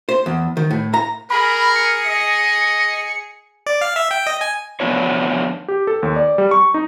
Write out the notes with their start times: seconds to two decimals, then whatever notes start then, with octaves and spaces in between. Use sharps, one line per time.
0.09 C5
0.26 E2
0.57 D#3
0.71 A2
0.94 A#5
1.30 G#4 A#4 B5
1.76 C#7
2.07 D#5
3.66 D5
3.81 F5
3.96 E5
4.11 G5
4.27 D#5
4.41 G#5
4.80 D3 F3 B3 D4 E4 C#5
5.68 G4
5.87 A4
6.03 D#2
6.16 D5
6.38 G3
6.51 C#6
6.74 D#4